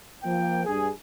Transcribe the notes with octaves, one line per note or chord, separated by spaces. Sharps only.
F3 A#3 G5
G2 G#4